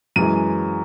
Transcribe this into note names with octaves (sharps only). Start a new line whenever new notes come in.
F#2 E3 G#3 D#7